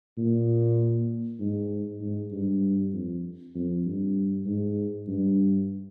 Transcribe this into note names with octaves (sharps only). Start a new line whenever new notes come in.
A#2
G#2
G#2
G2
F2
F2
G2
G#2
G2